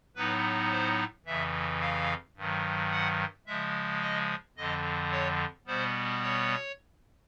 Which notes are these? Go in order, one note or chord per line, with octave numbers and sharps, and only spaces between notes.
A2 F#3 B3 D#4 B4
C5
F2 C#3 E3 E5
F5
G2 D#3 F#3
F#5
C#3 F3 G#3 E5
D#5
F2 D3 F3 D#5
C#5
B2 G3 B3 C5
C#5